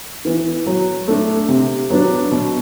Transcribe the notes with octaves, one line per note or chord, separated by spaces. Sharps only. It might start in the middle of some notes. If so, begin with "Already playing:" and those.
E3 B3
F#3
A3 D4
C3
F#3 B3 D4
B2